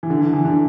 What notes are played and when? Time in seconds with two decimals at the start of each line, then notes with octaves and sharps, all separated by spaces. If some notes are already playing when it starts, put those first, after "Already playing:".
0.03 E3
0.10 D3
0.21 E3
0.33 E3
0.45 D3